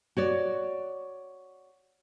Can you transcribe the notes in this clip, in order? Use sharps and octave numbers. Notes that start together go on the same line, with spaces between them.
F#4 C#5 D5